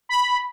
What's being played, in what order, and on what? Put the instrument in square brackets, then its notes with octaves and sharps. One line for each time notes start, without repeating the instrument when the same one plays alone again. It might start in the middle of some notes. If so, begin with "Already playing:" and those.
[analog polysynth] B5